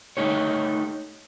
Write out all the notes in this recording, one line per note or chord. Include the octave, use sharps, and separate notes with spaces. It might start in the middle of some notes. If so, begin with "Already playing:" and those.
A3 D#4 G4 C#5